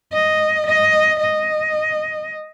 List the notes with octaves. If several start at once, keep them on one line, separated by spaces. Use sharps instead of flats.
D#5
D#5
D#5